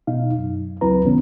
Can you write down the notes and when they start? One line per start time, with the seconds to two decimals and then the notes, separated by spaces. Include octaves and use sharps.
0.07 B2 D#4 F5
0.39 F#2
0.81 C#2 F#3 C4 E4 B4 A#5
1.05 C3 D#3 B3 C#4